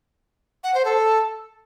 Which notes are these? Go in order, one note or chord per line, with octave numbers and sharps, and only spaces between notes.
F#5
C5
A4